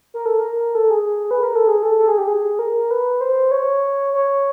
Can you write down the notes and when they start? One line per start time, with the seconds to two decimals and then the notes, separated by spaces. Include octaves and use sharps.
0.14 A#4
0.26 A4
0.39 A#4
0.75 A4
0.91 G#4
1.31 B4
1.43 A#4
1.55 A4
1.68 G#4
1.83 A4
1.98 A4
2.08 G#4
2.18 G4
2.28 G#4
2.59 A#4
2.91 B4
3.21 C5
3.51 C#5
4.14 C#5